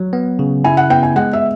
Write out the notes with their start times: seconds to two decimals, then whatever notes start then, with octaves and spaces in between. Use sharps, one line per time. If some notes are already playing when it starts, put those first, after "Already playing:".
Already playing: F#3
0.13 B3
0.39 C#3
0.64 E4 G#5
0.77 F#5
0.90 B3 G5
1.03 G#5
1.16 G#3 F#5
1.33 E5